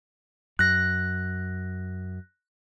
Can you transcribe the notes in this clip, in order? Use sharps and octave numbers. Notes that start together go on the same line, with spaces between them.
F#2 F#6 A#6